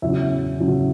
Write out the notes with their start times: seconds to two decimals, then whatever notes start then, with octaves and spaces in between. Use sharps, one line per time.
0.02 E2 C#3 F#3 C#4 E5
0.59 E2 C#3 F#3 C#4